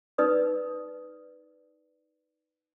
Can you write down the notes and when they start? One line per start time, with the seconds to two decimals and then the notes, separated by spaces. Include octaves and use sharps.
0.18 D#4 A#4 B4 D5 D#6